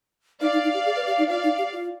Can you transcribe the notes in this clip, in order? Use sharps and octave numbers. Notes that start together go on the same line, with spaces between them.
D#4 D5 F5
D#4
D#4
G4
G#4
B4
G4
D#4
F4 D5 F5
D#4
G4
F4